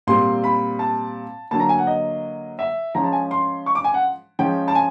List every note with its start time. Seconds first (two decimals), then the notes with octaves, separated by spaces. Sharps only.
0.07 A#2 G3 C4 C6
0.44 B5
0.79 A5
1.51 D3 F#3 A#3 A5
1.60 A#5
1.69 G#5
1.78 F#5
1.87 D#5
2.59 E5
2.95 F3 G#3 C#4 A#5
3.04 A5
3.13 G#5
3.31 C6
3.66 C#6
3.75 D6
3.84 G#5
3.94 F#5
4.39 F3 G#3 C#4 G5
4.68 A5
4.75 G#5